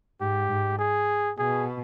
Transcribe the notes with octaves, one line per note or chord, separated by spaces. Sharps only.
G#2 G4
G#2
G#4
B2 G#4